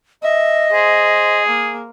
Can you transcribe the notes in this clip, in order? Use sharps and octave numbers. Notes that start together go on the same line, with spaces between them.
D#5 E5
G#4 C5
A#3